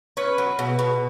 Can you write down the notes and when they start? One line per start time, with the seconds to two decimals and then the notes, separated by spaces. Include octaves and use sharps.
0.17 C#4 B4
0.38 F#3
0.59 B2
0.79 B2